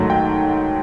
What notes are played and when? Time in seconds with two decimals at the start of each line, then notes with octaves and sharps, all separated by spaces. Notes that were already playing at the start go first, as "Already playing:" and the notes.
Already playing: G#2 D#3 F#3 A3
0.10 G5